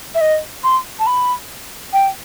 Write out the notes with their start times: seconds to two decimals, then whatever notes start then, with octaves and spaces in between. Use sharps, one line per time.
0.15 E5
0.21 D#5
0.64 C6
0.99 A5
1.07 B5
1.93 G5